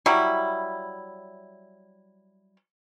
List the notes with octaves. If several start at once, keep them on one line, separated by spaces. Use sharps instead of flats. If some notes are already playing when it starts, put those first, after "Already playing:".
F#3 G3 E4